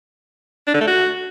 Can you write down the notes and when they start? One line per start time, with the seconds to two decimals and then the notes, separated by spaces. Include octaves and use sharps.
0.67 D4
0.74 D3
0.81 A3
0.88 F#4